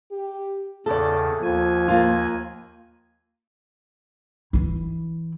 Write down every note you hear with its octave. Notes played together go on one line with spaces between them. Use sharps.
G4
E2 A2 C#3 A4 D5
D#2 F3 G#5
A#3 F4
E3 E4